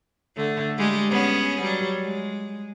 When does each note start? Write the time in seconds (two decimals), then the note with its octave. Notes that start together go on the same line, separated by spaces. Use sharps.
0.37 D3 A3
0.78 G3 G#3 G4
1.10 B3 C#4 G#4
1.62 F#3 G3
2.00 G#3